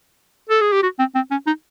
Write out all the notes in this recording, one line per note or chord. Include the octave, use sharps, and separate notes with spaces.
A4
G#4
G4
F#4
C4
C4
C#4
D#4